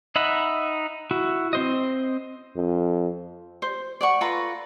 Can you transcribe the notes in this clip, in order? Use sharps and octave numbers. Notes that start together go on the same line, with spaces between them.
D#4 D#5 E5 F#5 B5
E4 F#4
C4 C5 D#5
F2
C5
D5 F#5 C#6
F4 A4 B4 A#5